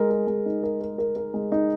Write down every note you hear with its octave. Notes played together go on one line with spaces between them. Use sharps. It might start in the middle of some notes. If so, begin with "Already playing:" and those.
Already playing: G#3 A#4
A#4
G#3
D#4
A#4
A#4
A#4
A#4
G#3
D#4